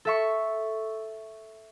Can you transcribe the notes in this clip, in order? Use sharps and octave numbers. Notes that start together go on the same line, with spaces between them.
A4 E5 C#6